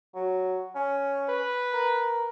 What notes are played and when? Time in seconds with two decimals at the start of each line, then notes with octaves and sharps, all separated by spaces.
0.15 F#3
0.75 C#4
1.29 B4
1.73 A#4